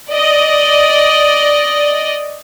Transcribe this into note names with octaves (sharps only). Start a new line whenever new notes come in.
D5 D#5